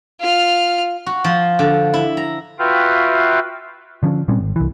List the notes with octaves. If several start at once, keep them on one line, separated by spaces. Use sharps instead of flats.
F4 F6
F#4
F3
D3
E4
A#5
F4 F#4 B4 E5 F5 G5
D3 F3 C#4
A#2 G3 C4 C#4
G#1
C2 E3